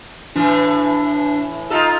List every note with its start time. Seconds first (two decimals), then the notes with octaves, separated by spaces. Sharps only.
0.36 A2 E3 D4
1.70 D#4 F4 A4